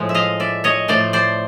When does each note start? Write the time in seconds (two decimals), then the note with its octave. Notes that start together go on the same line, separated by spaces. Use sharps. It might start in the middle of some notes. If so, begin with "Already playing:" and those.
Already playing: A2 F3 G#3
0.09 E5
0.14 D#5 F5
0.40 D5 E5
0.64 C#5 D#5
0.88 A2 F3 A3 C5 D5
1.13 C5 D5